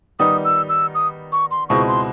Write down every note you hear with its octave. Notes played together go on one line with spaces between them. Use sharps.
D#3 G3 B3 D#4 D#6
E6
E6
D#6
C#6
C6
C#2 B2 G#3 C4 E4 C#6
C6